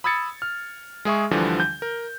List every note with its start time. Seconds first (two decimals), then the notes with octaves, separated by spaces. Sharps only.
0.04 B5 D#6 E6 G#6 A6 C#7
0.42 F6
1.05 G#3 G#4 E5 C#6
1.31 D2 D3 E3 F3 G3
1.60 G6
1.82 A#4